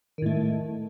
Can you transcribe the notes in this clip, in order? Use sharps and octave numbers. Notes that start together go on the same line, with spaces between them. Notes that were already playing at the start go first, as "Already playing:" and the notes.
A2 D#3 A3